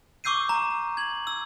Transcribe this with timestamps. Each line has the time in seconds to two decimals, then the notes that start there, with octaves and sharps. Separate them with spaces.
0.24 C#6 D6 E6 G6 C7 D#7
0.49 A#5
0.97 G#6 F#7
1.27 E6